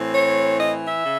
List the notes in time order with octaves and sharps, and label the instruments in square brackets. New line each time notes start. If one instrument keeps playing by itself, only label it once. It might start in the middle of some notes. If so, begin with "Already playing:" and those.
Already playing: [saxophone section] A2 E3 C4
C#5
D#5
E5
C#3